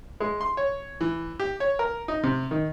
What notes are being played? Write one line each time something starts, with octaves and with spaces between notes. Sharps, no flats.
G#3
C6
C#5
E3
G4
C#5
A#4
D#4
C3
D#3